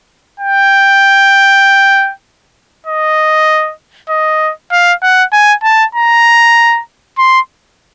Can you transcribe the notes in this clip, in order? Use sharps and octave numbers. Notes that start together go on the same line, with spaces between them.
G5
D#5
D#5
F5
F#5
G#5
A5
A#5
C6